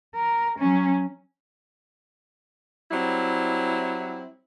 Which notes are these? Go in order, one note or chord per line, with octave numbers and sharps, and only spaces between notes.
A#4
F#3 C#4
F#3 G3 C4 E4